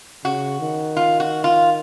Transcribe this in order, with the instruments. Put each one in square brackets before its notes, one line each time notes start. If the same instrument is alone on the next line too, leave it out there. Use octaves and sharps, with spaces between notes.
[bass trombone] C#3 [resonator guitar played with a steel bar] F#4
[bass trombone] D#3
[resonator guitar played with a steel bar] F4
F#4
F4